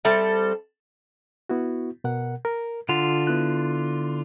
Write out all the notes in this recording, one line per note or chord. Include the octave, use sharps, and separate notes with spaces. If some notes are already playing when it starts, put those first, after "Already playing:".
G3 C4 A4 E5
B3 E4 F#4
B2 A#4 F#5
A#4
D3 F4 F#5
B3 E4 F#6